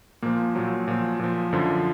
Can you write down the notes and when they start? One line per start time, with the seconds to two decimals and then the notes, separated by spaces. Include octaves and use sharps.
0.22 A#2 F3 A#3
0.55 A#2 F3 F#3
0.88 A#2 F3
1.20 A#2 F3
1.52 F#2 D3 F3